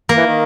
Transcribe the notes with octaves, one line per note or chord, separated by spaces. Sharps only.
A#3
E3
D#3